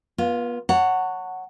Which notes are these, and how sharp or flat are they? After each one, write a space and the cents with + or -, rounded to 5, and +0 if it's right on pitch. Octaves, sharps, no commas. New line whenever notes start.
B3 -35 F4 +5
C#5 +0 F#5 +0 A5 +45